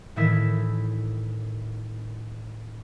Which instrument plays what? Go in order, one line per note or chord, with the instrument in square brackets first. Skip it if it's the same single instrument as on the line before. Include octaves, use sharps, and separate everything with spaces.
[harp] A2 D#3 E3 E4 E6 B6